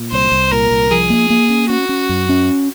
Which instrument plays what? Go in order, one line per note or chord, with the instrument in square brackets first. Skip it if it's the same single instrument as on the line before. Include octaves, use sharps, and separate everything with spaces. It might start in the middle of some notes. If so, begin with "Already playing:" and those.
Already playing: [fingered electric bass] A#2
[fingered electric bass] C2 [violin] C5
[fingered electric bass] C2
[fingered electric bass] A#2 [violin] A#4
[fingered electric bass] C2
[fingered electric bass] F3 [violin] G#4
[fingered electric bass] A#3
A#3
C#4
[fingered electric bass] C#4 [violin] F#4
[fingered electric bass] C#4
F#2
C#4